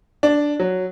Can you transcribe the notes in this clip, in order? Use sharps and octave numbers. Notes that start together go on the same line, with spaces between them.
D4
F#3